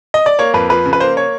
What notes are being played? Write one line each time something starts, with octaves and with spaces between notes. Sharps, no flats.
D#5
D5
A#3 C#5
F2 B4
F3 B4
C#3
B4
A#3 C5
C#5